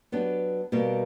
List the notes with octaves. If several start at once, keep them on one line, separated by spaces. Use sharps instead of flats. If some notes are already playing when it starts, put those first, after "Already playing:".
F#3 B3 D4 G4
B2 G3 A#3